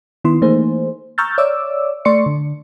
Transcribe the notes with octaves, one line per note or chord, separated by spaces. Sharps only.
D#3 B3 E4 C6
E3 A3 A#3 D#4 G#4 C5
A#5 C#6 E6 F6 G6 A6
C#5 D5 E5 D6 E6
A3 D5 C6 C#6 C#7
D3